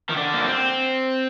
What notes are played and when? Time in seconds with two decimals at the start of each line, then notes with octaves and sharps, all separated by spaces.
0.09 D#3
0.16 D3
0.34 A#3
0.44 C4